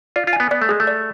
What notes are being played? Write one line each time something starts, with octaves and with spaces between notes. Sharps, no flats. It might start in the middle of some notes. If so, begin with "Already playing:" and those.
F4 D5
F4
G#5
B3
B3 D5
A3
G#3 G#4
A3
D5